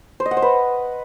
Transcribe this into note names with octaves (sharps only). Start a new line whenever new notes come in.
C5
D#5
F#5
C5
B4